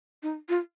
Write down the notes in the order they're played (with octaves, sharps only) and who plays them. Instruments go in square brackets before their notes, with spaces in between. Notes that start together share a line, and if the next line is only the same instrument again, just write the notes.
[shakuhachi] D#4
F4